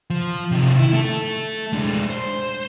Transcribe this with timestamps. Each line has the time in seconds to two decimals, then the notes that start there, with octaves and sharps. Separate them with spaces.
0.10 F3
0.51 C3 D#3
0.79 E4
0.93 A3 A4
1.73 G#3 D4
2.10 C5